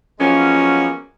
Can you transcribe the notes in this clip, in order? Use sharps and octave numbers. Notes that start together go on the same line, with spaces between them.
F3 F#3 G#3 A#3 B3 C#4